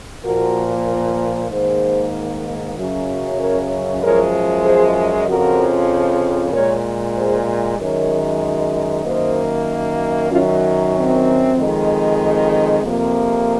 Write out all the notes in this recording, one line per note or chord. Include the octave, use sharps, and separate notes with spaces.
A#2 F3 A#3 F#4 A#4
G#2 D#3 A#3 G#4 C5
F#2 C#3 F#3
A#4 C#5
F#2 F3 G#3 A#4 C#5
G#4 C5
F2 C#3 F3 F#4 A#4
A#2 G#3 A#4 C#5
G#4 C5
F#2 D#3 G#3 A#4 C#5
F#2 D#3 A#3 C5 D#5
F#2 D#3 F#3 C#4 F4
C4
F2 D#3 G#3
F2 C3 F3 A#3